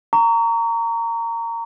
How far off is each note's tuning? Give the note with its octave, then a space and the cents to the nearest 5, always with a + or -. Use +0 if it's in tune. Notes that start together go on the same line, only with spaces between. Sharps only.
A#5 -15 C#6 +30